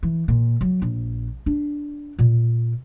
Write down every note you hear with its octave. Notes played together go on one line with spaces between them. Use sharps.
E3
A#2
F#3
A#1
D4
A#2